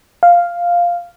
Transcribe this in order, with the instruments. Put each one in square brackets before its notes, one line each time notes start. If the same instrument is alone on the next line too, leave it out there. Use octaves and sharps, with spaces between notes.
[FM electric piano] F5